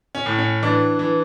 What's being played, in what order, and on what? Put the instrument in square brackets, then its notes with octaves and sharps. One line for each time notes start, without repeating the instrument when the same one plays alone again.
[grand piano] C#4
A2
C#4
E3 D4
E3